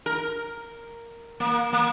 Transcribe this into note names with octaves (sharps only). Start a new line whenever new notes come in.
A#4
A#3
A#3